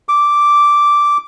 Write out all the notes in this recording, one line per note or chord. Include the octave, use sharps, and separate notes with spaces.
D6